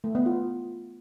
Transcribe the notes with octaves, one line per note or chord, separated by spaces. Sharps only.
A3
B3
F4